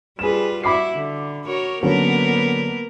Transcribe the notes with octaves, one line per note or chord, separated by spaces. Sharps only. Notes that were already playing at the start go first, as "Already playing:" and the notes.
G3 F4 G#4 B4 E7
E4 F#4 B5 D6 C7
D3
F#4 A#4 C#5
D3 F#3 A#3 B3 C#4 A#4